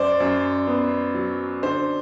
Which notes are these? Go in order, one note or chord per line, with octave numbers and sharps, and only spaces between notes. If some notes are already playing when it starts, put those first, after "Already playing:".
Already playing: F#2 C5 D5
F#2
B3
F#3
D3 C5